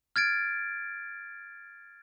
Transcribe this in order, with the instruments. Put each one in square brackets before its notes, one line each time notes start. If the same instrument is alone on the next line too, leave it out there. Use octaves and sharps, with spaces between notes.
[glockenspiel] F6 G#6 A6 D7